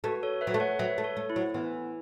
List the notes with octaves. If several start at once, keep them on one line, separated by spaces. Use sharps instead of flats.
A3 F#4 B4
A4 C#5
B4 E5
F#3
A3
C#5 F#5
F#3 B4 E5
A3
A4 C#5
A3
E4
F#3
E3 B3